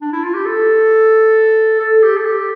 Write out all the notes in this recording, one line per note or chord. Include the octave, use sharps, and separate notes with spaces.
D4
E4
F4
G4
A4
A4
G4
A4
G4